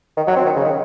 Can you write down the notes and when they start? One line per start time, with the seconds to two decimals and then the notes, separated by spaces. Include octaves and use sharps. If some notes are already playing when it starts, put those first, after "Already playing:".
0.17 D#3
0.27 F#3
0.36 C4
0.45 D#3
0.56 C#3
0.64 D#3